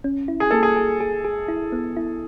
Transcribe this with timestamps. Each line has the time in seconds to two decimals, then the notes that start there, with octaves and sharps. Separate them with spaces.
0.04 C#4
0.28 E4
0.40 G#4
0.51 A#3 A4
0.63 G#4
0.76 G#4
1.00 G#4
1.25 G#4
1.48 E4
1.72 B3
1.97 E4